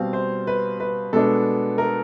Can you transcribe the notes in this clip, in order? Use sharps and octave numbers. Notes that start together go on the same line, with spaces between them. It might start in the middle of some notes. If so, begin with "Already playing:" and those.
Already playing: B2 G3 C4 F5
C5
B4
B4
B2 G#3 B3 D4 A4
A#4